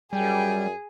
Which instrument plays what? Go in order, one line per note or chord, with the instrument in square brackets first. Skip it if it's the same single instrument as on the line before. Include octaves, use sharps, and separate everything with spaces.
[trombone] F#2 [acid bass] G3 [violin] G#4 [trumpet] G5